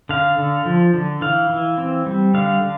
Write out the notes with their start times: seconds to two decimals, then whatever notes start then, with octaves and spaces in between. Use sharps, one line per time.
0.09 D3 F5
0.38 D3
0.65 F3
0.94 D3
1.21 E3 F5
1.50 E3
1.78 C4
2.06 G3
2.34 D3 F5
2.62 D3